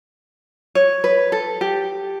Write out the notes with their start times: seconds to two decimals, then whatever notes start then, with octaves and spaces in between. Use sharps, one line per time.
0.75 C#5
1.04 B4
1.32 A4
1.61 G4